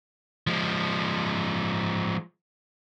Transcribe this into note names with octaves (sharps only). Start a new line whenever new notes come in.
F3 G#3